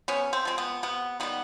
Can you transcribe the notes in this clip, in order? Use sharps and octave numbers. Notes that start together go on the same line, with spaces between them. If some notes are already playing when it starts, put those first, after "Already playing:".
C3 B3 C#4
C4
F3 G#3 C4
B3
C3 B3
D#3 G3 B3